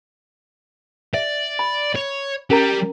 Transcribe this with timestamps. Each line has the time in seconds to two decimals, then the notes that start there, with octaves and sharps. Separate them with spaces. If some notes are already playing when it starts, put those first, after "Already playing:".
1.14 D5 E5
1.59 B5
1.95 C#5
2.50 G3 C#4 A#4 A#5